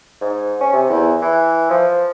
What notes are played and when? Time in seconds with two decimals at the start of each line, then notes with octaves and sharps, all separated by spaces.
0.21 G#2
0.61 C#4
0.73 C3
0.90 E2
1.22 E3
1.70 F3